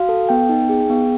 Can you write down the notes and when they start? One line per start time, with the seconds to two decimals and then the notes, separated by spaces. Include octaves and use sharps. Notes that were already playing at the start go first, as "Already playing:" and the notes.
Already playing: F#4 F5
0.09 A4
0.29 B3 G5
0.49 D#4
0.69 G#4
0.90 B3